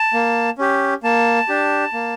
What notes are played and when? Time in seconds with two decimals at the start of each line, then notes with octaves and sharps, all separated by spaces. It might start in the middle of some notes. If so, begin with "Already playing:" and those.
Already playing: A5
0.13 A#3
0.58 C#4 G4
1.03 A#3 A5
1.48 D4 G4
1.93 A#3